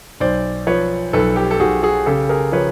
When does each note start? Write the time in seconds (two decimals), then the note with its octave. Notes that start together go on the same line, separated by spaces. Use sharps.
0.20 B1 C5 D5
0.67 F3 B4 C#5
1.13 B1 A4 B4
1.36 G4 A4
1.51 A4
1.59 B1 F#4 G#4
1.83 F#4 G#4
2.06 C#3 G4 A4
2.29 G#4 A#4
2.52 F3 B4 C#5